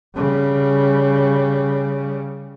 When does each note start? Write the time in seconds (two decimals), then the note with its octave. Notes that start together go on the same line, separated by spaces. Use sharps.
0.16 C#3 G3